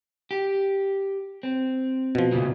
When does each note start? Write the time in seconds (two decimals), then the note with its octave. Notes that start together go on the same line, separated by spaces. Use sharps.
0.31 G4
1.43 C4
2.15 B2 F3
2.32 F2 A#2 C#3